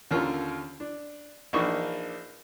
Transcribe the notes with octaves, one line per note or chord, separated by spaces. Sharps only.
D#2 D3 C#4 F4 A#4
D4
A#1 E3 A#3 D4 D#4 C#6